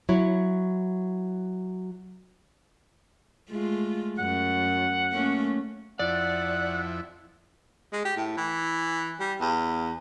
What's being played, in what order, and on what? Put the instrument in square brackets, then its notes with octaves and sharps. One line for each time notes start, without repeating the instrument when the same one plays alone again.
[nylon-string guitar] F#3 E4 C#5
[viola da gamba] G#3 A3 F4
[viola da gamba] F#2 [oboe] F#5
[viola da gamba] A3 A#3 C#4
[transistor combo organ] F2 E4 [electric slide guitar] D5 [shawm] F#5
[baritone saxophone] G#3
G4
A2
E3
G3
E2